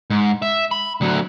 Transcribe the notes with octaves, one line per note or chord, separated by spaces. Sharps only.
G#2
E5
B5
D2 F#3